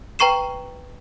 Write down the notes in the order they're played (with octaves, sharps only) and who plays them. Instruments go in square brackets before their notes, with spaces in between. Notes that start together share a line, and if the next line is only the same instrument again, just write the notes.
[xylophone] B4 G5 A#5 C#6 C7 E7